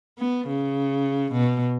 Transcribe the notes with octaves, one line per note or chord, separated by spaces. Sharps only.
B3
C#3
B2